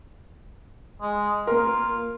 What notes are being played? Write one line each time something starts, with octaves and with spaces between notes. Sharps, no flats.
G#3
A#3 F4 A#4